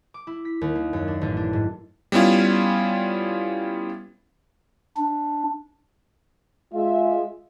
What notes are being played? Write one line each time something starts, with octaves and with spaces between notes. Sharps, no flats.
D6
E4
B6
D#2
A#3
F#2
D4
A1
D4
G#2
G3 B3 C#4 E4 F4
D4
G#3 F4 E5